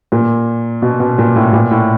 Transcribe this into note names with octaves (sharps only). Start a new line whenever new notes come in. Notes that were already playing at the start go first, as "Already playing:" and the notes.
A#2
B2
B2
A#2
A2
A#2
A2